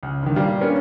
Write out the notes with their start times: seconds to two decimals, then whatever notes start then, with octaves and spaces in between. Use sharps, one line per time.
0.03 C#2
0.23 G2 D#3
0.36 A#2 G3 F5
0.61 A#3 B3 C#4 D4 A#4